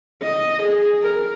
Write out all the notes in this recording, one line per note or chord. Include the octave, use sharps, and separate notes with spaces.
D#5
G#4
A#4